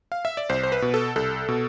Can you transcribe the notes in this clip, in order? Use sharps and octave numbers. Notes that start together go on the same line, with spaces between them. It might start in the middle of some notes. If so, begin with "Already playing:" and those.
F5
E5
D5
C2 C5
C5
B4
B2
A4
C2 A4
B2